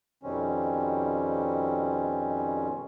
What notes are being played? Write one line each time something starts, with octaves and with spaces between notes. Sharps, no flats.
F2 B2 D#3 G3 C4 C#4